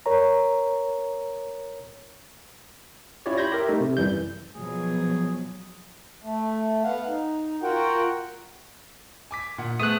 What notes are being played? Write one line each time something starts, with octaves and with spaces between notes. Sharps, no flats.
A#4 C#5 A#5
C#4 E4 F4 G4 C#5 D5
B5 C6 G6 G#6 A#6
G4 A#4 E5
A3 D#4
C3
F#2 E3 G3 G6
B2 F3 F#3 G#4
A3
B3 F5 F#5
D#4
F4 F#4 A#4 F#5 G5
G#5 D6 B6
A#2 F#5
A3 B3 G#4 D#6 F#6